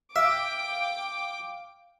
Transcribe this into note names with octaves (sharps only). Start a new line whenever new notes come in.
E5 F5 G5 D6